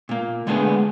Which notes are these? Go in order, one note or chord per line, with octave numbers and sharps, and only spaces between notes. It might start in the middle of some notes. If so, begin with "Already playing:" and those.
A#2 A#3
D3 G#3 A3 B3 D4 G#4